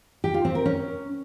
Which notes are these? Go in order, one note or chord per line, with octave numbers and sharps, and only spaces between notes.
G4
F4
C4
A#4
C#4